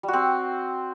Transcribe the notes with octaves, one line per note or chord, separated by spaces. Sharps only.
G3
F#4
C4